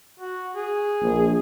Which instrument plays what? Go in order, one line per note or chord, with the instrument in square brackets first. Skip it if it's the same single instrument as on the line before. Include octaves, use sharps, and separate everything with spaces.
[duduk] F#4
G#4
[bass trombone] A#1